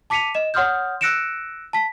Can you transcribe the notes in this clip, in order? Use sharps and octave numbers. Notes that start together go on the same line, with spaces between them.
A5 D6 B6 C#7 D#7 F7
D#5 E7
C#5 F#5 C6 D#6 F6 G6
E6 F#6 A#6 C#7 D7 E7
A5 B6